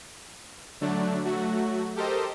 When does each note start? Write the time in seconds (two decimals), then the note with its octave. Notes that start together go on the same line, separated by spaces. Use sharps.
0.81 D3 F#3 A3 D4
1.25 F#3 A3 F#4
1.96 G4 A4 A#4 C5 D#5